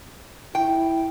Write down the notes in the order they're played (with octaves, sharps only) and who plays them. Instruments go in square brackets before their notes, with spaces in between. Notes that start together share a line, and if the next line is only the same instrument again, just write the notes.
[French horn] E4 [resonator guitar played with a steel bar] G5